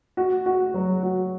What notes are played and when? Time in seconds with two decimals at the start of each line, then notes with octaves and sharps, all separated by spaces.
0.17 F#4
0.46 F#4
0.74 F#3
1.03 F#4